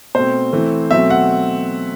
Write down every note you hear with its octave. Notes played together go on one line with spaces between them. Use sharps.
B2 A3 C4 C5
E3 A3 C4
B2 F#3 A3 C4 E5
F#5